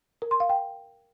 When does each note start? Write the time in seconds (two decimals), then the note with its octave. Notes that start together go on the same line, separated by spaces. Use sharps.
0.22 A#4
0.31 C6
0.40 F5
0.49 G5